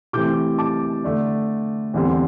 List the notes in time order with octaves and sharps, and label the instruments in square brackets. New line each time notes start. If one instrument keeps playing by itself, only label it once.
[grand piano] C3 E3 A3 C4 D6 G6
A5 D6
D3 A3 D4
E2 D3 G3 C4